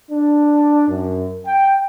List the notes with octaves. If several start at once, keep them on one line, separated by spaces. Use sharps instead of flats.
D4
F#2
G5